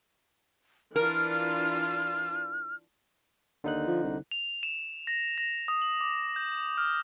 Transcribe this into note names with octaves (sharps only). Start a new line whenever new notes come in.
E3 D4 F4 A#4 F6
D#2 D3 D#4 F#6
F3
C2
F7
E7
A#6
A#6
D#6
F#7
D6
G6
F6